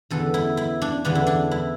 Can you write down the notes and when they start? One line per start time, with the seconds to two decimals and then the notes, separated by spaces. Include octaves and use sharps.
0.10 E2 D3 B3 A4
0.34 E4
0.57 E4
0.82 D4
1.05 E2 D3 B3 D4
1.15 E4
1.27 D4
1.51 E4